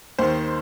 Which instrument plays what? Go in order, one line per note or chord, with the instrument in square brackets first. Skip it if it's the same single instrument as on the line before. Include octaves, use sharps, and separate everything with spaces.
[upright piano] D#2 D#3 C5